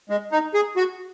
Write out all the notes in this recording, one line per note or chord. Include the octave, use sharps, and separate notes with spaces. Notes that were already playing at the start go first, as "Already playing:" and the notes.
G#3
D#4
G#4
F#4